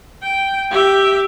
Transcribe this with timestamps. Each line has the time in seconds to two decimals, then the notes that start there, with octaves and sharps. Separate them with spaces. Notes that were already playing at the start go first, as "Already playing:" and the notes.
0.23 G5
0.71 G4 E5